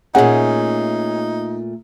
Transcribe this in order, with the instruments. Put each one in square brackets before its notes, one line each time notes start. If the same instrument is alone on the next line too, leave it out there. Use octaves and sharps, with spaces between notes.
[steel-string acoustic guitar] A#2 A3 [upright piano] C#4 G#4 [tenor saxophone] D#4 [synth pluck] F#5